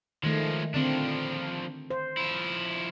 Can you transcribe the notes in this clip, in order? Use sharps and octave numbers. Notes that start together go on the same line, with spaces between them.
D#3 F3 G#3 A3
D3 F3 C4 D4
C5
F3 E4